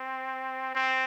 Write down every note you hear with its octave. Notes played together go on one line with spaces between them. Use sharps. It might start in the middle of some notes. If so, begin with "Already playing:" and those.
Already playing: C4
C4